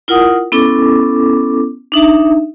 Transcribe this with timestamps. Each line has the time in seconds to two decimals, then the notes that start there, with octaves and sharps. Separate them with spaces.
0.08 E4 F4 A#4 F#5 D#6
0.52 B3 C#4 E4 A4 D6
1.92 D4 D#4 E5